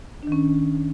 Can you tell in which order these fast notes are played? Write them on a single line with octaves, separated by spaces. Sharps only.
D4 D#3 C#4